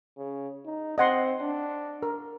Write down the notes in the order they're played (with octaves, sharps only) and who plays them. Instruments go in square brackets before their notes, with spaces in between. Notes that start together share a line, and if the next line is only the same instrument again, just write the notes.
[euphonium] C#3
D#4
[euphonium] C4 [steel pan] D#5 F#5 C6
[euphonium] D4
[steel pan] A#4